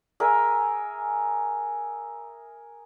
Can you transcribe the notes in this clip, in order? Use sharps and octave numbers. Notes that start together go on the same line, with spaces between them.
G#4 A#4 E5 G#5